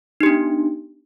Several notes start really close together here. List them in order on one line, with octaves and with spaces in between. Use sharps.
D#4 G4 D4 B3